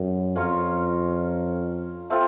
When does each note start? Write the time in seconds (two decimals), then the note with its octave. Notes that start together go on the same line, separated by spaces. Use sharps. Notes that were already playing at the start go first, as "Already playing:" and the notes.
Already playing: F#2
0.36 F2 C#4 F4 A#4 C#5
2.10 A3 C4 F4